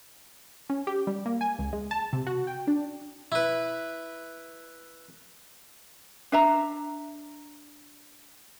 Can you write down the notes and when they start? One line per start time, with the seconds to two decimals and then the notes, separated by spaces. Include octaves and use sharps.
0.70 C#4
0.87 G4
1.07 G3
1.26 A#3
1.41 G#5
1.59 C#2
1.73 G#3
1.91 A5
2.13 C3
2.27 F#4
2.47 G5
2.67 D4
3.32 E4 B4
6.32 D4 E5 A#5